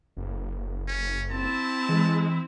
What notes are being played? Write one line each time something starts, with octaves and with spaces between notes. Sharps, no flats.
F#1
C#4
C4 E4 A5
E3 G#3